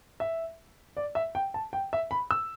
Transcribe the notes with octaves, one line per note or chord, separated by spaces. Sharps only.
E5
D5
E5
G5
A5
G5
E5
B5
E6